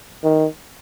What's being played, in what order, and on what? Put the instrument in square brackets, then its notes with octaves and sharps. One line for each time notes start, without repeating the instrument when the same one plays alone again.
[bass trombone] D#3